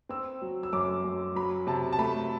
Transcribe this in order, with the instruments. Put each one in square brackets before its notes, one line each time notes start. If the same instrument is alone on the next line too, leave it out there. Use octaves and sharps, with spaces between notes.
[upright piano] C4 E6
F#3
E6
F#2 D6
F#2
F#3 B5
C3 A5
A5
A3 B5